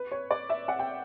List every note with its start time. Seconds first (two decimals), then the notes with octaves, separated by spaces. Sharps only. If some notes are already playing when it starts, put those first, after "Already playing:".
Already playing: B4
0.12 C#5
0.31 D5
0.50 E5
0.68 F#5
0.79 G5